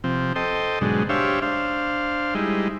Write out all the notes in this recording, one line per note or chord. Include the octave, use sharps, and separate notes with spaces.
C3 F3 C4
A4 C5 D#5 G5
G#2 B2 D3 F#3 G#3
D4 G4 C5 C#5 E5 F5
D4 C5 F5
G3 G#3 D#4 E4